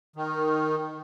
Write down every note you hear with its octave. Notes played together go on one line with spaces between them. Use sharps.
D#3